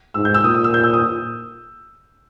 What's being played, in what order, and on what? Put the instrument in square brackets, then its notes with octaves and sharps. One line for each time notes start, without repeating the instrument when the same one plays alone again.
[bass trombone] G#2 [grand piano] E6
[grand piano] G6
E6
[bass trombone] A#2 [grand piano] D#6
[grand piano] D#6
E6
G6
E6
D#6